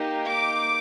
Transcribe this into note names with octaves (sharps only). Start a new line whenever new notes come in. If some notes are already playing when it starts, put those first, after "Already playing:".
Already playing: A#3 D#4 G4
D6